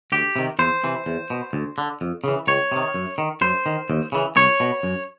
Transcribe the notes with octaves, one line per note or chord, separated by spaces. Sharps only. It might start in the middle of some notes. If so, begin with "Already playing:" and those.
D2 G4
C3 D#3
E2 C5
C3 E3
E2
B2
D2
D3
F2
C#3 E3
C#2 C#5
C3 D#3
F#2
D#3
F#2 C5
D#3
D#2
C#3 E3
C2 C#5
B2
F#2